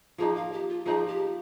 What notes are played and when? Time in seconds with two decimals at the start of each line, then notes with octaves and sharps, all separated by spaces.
0.18 F3 A#3 D#4 G#4
0.35 F5
0.52 G4
0.69 F4
0.85 F3 A#3 D#4 G#4
1.07 G4